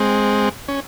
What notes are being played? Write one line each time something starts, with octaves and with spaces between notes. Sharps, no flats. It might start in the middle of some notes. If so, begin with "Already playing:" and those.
Already playing: G#3 C4
C#4